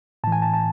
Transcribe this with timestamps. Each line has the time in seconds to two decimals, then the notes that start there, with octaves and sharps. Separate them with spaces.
0.24 A2 E3 A5
0.32 G#5
0.42 A5
0.54 A5